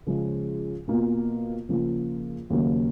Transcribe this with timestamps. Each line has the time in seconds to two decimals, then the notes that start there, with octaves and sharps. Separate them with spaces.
0.07 C#3 F3 G#3 C#4 F4
0.88 B2 A#3 F4
1.69 C#3 F3 A#3 F4
2.50 D#2 C#3 F#3 A#3